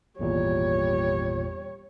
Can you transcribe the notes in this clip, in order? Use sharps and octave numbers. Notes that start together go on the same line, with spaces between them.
G#1 E2 A#2 G3 C#5